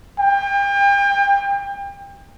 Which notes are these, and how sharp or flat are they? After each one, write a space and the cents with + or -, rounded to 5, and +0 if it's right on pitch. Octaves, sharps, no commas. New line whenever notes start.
G5 +35